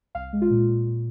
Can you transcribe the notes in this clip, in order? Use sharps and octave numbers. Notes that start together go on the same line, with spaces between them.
C2 F5
G#3
F4
A#2
A#2
A#2